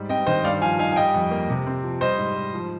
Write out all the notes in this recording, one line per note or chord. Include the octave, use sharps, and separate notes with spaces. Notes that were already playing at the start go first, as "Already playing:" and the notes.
Already playing: G#2 G3
C4 D#5 G5
D#3 C5 D#5
G2 D5 F5
F3 F5 G#5
D#4 F5 G#5
G#5
G3 D#5 G5
F2
A#3
C3
C4
F3
G3 C5 D#5
G#2
G#2
F3